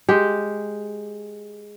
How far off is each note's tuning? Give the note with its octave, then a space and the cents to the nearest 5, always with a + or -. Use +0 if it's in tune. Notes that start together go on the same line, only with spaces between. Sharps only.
G#3 +0 G4 +0